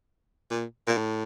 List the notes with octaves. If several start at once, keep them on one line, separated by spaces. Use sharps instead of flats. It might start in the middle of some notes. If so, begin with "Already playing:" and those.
A#2
A#2
A2